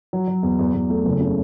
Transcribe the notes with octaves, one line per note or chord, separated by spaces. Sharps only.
F#3
F#3
E2
E2
E2
A3
F#1
C#3